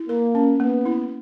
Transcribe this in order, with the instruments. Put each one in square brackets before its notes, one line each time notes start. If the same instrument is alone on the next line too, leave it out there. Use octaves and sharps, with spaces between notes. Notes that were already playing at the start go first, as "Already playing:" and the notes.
Already playing: [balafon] E4
[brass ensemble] A#3 [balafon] A#4
[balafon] C#4
[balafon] A#3 [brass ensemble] B3
[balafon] E4